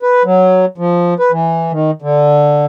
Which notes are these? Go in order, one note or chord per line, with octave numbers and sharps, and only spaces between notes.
B4
F#3
F3
B4
E3
D#3
D3